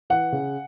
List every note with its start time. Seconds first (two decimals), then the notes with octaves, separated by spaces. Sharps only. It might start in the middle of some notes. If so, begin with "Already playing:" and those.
0.10 E3 F#5
0.32 C#3